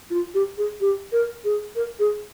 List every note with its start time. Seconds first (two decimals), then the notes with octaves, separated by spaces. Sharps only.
0.10 F4
0.34 G4
0.58 G#4
0.81 G4
1.12 A#4
1.44 G#4
1.76 A#4
1.99 G#4